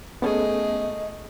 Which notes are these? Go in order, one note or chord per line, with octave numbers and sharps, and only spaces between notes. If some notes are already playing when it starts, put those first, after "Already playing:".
A3 B3 C#4 G#4 A4 D#5